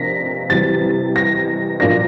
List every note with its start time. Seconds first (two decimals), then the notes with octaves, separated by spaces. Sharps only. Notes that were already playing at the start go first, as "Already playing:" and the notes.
Already playing: C3 F3 A#3 D4 A#6 B6
0.50 C3 E3 G3 A6
1.16 A#6
1.80 A#2 F3 A#3 D4 A#6